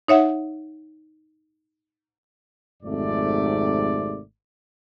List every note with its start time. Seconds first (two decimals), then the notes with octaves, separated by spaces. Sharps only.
0.08 D#4 C#5 E5 F#5
2.83 G#1 F2 G#2 C3 A3 D5